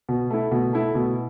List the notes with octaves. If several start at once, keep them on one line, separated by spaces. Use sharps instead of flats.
B2
A3 E4
B2
A3 E4
B2